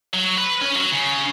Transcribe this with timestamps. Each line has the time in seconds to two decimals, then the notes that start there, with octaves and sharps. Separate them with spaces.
0.13 F#3
0.38 B4
0.62 C#4
0.76 F#3
0.92 C#3